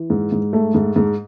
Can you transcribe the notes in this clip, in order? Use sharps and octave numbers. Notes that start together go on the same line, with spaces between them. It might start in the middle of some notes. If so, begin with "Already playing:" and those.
Already playing: E3
G#2
G#2
A3
G#2
G#2